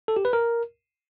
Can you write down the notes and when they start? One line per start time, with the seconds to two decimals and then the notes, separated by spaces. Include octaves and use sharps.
0.08 A4
0.17 G4
0.25 B4
0.33 A#4